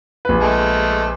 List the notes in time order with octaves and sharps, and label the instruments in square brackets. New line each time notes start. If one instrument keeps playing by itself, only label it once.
[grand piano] A#1 B4
[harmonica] G#3 A3